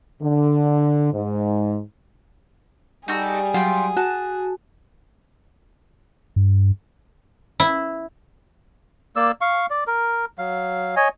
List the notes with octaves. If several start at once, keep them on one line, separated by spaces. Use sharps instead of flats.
D3
G#2
G3 D#4 F#4 G#4 A4
F#3 F4 G5
F#4 A5
G2
E4
A#3 D5 E6
F5 C#6
D5
A#4
F#3 F5
C#5 D#5 G#5